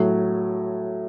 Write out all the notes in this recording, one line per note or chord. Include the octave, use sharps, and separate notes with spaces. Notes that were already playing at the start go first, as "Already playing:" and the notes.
Already playing: A2 F#3